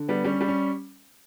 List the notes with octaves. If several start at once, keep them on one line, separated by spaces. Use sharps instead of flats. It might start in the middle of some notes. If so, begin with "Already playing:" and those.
Already playing: D3
G3 B3
G3 C#4
G3
C#4